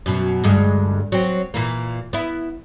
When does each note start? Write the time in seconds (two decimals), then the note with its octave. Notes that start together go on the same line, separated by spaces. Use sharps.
0.06 F#2 B2
0.44 D2 G2 G#3
1.12 F#3 C4
1.54 A#2 E3 A#3
2.13 B3 E4